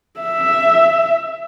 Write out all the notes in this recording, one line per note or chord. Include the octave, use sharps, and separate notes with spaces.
E5